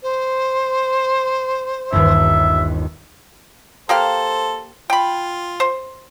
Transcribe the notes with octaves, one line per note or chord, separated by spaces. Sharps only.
C5
G1 D#2 E5
A#3 G4 A4 C5 F5
F4 G5 B5
C5